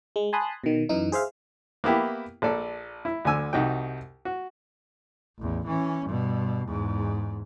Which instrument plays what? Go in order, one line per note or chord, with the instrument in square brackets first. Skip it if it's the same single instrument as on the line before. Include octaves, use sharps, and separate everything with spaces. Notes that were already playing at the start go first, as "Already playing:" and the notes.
[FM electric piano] G#3
G#5 A5 B5 C6 D#6 F#6
B2 D#3
F#2 E3 D#4
G#4 C5 E5 F5
[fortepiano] A#3 B3 E4 G4
A#1 A4 D5
E4
D2 D3 G#5 E6
C2 D#4 F#4 G4 G5
F#4
[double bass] A1 E2
E3 C#4
G2 B2
E2 G#2